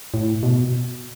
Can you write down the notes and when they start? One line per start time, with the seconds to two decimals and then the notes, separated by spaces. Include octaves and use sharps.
0.14 A2
0.43 B2